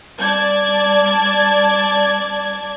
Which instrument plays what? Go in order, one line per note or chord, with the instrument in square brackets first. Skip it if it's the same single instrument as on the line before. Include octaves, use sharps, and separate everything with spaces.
[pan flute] G3 [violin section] D5 A5 G#6